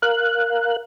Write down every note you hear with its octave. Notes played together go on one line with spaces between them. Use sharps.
A#4 F5 F#6